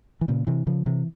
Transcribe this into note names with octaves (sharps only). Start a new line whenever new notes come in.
E3
A#2 C#3
C3 E3
C#3 F3
C3 E3